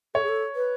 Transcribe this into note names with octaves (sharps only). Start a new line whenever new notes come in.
A4 C#5
G#4
A4
B4